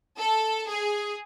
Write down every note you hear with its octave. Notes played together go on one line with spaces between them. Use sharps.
A4
G#4